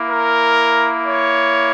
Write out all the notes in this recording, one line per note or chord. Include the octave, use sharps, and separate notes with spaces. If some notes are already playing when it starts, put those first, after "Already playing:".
Already playing: A#3 E4
A#4
C#5